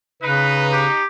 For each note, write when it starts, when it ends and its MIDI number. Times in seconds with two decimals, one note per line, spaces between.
0.23 0.86 49
0.23 1.03 63
0.23 0.82 71
0.73 1.06 67